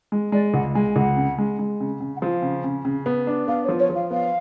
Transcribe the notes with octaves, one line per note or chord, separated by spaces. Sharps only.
G#3
G#3 D5
C#2 F#5
G#3 G#5
C#2 F#5
C#3
G#3
G#3
C#3
C#3
F#5
F3 F5
C#3
C#3
C#3
B3
D4
B3 F5
C#5
F3
C#5
F3
F5
B3 F5